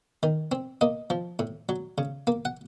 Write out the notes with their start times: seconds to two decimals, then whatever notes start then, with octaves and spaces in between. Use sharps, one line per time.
0.23 D#3
0.52 C4
0.81 A#3 D#5
1.10 F3
1.39 A2
1.69 F#3
1.98 C#3
2.27 A#3
2.45 F#5